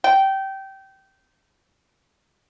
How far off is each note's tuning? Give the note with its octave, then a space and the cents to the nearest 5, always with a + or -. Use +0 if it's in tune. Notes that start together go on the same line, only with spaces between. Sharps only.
G5 -20